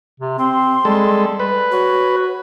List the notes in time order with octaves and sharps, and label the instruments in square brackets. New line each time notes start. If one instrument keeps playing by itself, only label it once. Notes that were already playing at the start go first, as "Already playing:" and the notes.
[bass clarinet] C3
[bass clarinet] C4 [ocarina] C6
[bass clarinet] G3 [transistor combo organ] G#3 A4
[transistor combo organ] B4
[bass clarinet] F#4 [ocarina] C#5